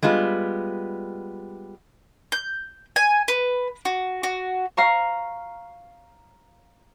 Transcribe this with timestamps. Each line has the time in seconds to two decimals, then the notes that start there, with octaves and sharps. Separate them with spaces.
0.03 G3 G#3 B3 F4
2.32 G6
2.96 G#5
3.28 B4
3.85 F#4
4.23 F#4
4.77 F5 A#5 C#6